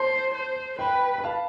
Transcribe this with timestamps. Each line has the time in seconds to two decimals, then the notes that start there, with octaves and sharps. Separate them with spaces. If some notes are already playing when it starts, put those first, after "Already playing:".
Already playing: C5 A5 C6
0.34 C5
0.79 B4 G5 B5
1.18 B5
1.24 F5 A5